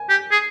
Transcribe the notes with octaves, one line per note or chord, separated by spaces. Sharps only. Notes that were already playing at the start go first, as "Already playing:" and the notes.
Already playing: G#5
G4
G#4